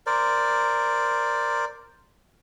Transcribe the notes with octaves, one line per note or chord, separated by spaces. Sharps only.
A#4 C5 D5